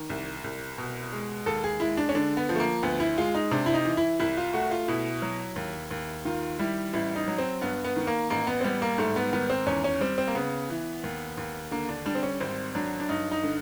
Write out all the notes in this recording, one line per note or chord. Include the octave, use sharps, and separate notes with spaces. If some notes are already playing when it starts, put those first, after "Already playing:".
Already playing: D#3
C2
C2
B2
G#3
D#2 A4
G#4
G#3 E4
D4
C#4
D3 D4
B3
F3
A3
A#3
D2 B3
E4
G#3 F4
D#4
C3 D4
E4
D#4
E3
E4
C2 E4
F4
A3 F#4
F4
B2 E4
F#3
D#2
D#2
D#3 F4
G3 E4
A1 E4
D#4
F#3
C4
G2 B3
B3
D#3
A#3
A1 A#3
B3
C4
G3 B3
A#3
G#2 A3
B3
D#3 B3
C4
E2 C#4
C#4
G3 C4
C4
A#3
C#3 B3
E3
D#2
D#2
D3 A#3
D4
G3 D4
C4
C#4
G#1 C4
F#3 D4
D4
G2 D#4
D#4
D3